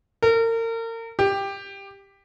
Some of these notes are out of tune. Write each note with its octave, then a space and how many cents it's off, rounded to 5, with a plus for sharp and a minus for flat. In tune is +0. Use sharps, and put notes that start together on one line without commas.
A#4 -35
G4 +10